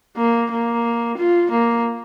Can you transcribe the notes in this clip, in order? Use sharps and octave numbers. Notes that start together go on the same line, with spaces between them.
A#3
A#3
F4
A#3